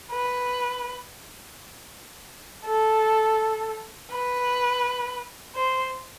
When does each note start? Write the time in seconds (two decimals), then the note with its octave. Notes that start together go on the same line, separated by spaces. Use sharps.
0.11 B4
2.65 A4
4.11 B4
5.56 C5